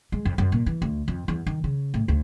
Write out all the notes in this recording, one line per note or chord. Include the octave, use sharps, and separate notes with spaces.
G#3
F2
F#2
A#2
E3
D2
F2
E2
D#3
C#3
A2
D2